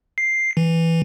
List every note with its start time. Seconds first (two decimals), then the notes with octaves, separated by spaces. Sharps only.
0.18 C7
0.57 E3